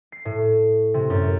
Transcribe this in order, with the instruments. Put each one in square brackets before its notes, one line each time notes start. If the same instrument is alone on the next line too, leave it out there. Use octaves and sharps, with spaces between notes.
[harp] C7
A2
C3
F#2